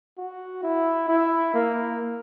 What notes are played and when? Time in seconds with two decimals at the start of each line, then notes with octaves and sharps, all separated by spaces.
0.17 F#4
0.63 E4
1.08 E4
1.54 A#3